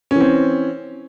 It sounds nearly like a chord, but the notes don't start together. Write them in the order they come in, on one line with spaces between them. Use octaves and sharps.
C#4 E3 C4